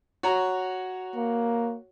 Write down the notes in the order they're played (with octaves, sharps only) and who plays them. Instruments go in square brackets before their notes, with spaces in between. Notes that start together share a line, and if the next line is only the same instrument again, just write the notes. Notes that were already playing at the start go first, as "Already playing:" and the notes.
[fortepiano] F#4 C#5 A#5
[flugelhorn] A#3